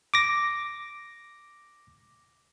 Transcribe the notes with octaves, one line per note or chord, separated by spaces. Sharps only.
D6 A#6